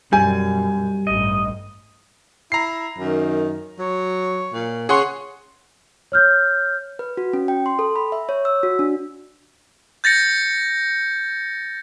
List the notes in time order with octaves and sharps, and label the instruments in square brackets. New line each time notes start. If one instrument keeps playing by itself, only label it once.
[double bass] F#2 B2 [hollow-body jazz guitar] G3 [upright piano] G#5
[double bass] A1 G2 [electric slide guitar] D#5
[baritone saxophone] E4 [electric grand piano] A#5 C7
[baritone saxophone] F#2 [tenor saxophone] D#3
[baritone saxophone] F#3 [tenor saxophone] C#5
[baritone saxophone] A#2
[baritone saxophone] C#3 [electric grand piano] G#4 F#5 C6 [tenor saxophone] C#5
[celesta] C#5 F6 G6
[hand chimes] B4
F#4
C#4
G5
C6
A4
B5
E5
C#5
E6
F#4
D4
[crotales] G6 A6 A#6 C#7